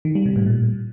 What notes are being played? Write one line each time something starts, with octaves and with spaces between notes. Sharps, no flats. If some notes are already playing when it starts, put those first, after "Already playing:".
D#3
G3
C3
A2
A#2